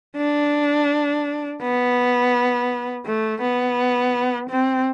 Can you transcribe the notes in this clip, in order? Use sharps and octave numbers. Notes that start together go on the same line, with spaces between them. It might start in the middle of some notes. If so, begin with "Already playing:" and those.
D4
B3
A3
B3
C4